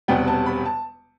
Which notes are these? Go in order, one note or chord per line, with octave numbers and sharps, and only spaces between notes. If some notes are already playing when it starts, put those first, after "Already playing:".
E1 E2 C3 G3 B3 G5
A5
B5
A5